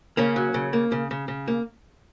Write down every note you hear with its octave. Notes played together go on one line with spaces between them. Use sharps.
C#3 A#3 C#4
F#3
C#3
A#3
C#3
C#3
C#3
A#3